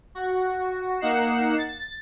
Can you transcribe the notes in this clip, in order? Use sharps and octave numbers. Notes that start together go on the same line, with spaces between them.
F#4
A#3 D#4 F#5 C7 E7
A6